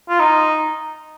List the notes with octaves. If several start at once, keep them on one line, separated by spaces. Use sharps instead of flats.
F4
D#4